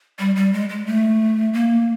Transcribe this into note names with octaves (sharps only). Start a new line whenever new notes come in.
G3
G3
G#3
G#3
A3
A#3